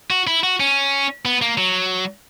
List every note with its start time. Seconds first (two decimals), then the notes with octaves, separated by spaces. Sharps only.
0.10 F#4
0.27 E4
0.43 F#4
0.60 C#4
1.25 B3
1.42 A#3
1.58 F#3